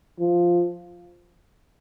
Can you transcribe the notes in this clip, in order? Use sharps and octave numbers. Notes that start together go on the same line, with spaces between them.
F3